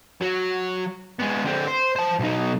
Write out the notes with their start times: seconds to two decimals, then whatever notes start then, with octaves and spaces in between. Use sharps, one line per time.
0.21 F#3 F#4
1.20 G#3 B3
1.45 D3 C4
1.68 C5
1.96 C5 A5
2.19 B1 D#4